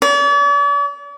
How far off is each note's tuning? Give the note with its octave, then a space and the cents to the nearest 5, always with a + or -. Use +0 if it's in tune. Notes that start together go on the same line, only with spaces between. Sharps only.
D5 -45